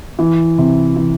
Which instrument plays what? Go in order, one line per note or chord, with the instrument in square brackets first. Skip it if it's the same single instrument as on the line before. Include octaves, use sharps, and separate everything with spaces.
[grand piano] E3
C3
E3